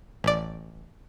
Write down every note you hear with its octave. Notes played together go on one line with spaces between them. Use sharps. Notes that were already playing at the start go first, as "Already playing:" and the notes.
A1 D5